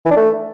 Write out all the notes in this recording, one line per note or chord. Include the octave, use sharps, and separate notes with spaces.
E3
D4
A3